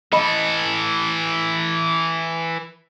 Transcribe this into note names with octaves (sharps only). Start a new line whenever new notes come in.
E3 A4 D#5 B5